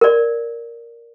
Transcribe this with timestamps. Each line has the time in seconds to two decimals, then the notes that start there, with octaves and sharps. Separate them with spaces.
0.01 A#4 D5